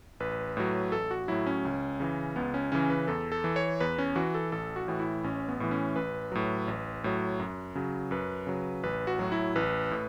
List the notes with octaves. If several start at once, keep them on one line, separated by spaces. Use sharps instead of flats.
A1 B4
A2 F#3
A1 A4
F#4
A2 F#3 E4
C#4
C#2
C#3 E3
C#2 B3
C#4
C#3 E3 C#4
B4
E2 A4
A4
E3
C#5
E2 B4
C#4
E3 F#4
A4
A1 A4
F#4
A2 E3
E4
A1 C#4
B3
A2 E3
C#4
A1 B4
A2 F#3
A1
A2 F#3
F#2
C#3 F#3
F#2 B4
C#3 F#3
A1 B4
F#4
A2 F#3
E4
A1 B4
A2